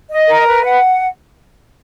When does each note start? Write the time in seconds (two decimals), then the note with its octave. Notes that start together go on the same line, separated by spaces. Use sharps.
0.10 D#5
0.29 A#4
0.47 B4
0.64 F#5